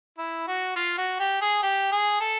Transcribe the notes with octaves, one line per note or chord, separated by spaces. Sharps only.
E4
F#4
F4
F#4
G4
G#4
G4
G#4
A4